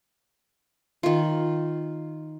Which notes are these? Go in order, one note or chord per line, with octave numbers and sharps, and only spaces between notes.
D#3 F4